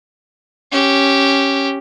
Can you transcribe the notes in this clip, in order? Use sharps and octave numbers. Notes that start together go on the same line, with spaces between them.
C#4 G4